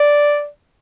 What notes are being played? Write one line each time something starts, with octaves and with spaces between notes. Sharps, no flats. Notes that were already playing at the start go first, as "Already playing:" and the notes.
Already playing: D5